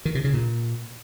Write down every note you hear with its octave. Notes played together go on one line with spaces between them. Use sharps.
D#3
C3
C#3
A#2